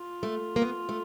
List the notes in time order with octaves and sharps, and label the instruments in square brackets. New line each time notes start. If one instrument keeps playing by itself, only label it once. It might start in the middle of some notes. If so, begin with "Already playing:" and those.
Already playing: [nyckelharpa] F4
[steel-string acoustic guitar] A3
A#3
B3
A3